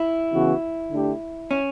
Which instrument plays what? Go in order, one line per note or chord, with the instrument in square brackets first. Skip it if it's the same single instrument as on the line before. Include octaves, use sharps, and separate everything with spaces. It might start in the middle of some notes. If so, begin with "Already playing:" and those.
Already playing: [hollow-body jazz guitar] E4
[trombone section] C#3 E3 B3 F#4
D3 A3 D4 G4
[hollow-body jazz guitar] C#4